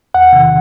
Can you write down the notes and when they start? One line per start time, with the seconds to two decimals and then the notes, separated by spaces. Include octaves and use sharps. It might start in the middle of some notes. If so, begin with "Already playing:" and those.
0.14 E2 F#5
0.33 C3 D#3